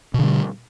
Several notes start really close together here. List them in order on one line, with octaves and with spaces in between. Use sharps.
B2 D3 G3